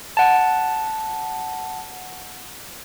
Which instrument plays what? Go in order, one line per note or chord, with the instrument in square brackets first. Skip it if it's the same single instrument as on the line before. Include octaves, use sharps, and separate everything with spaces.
[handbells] F#5 A5